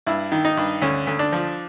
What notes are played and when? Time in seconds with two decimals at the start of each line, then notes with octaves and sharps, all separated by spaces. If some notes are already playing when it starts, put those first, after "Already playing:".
0.07 G2 E4
0.32 D#3
0.45 D#4
0.57 G2
0.82 D2 C#4
1.07 D2
1.19 D4
1.32 F3